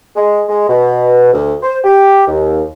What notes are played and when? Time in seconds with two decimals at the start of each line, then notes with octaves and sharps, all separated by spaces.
0.16 G#3
0.49 G#3
0.69 B2
1.32 D2
1.62 C5
1.84 G4
2.27 D#2